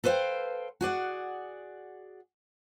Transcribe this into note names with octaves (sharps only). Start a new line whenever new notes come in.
A4 B4 C5 D5 F5 G5
F#4 G#4 D5 F#5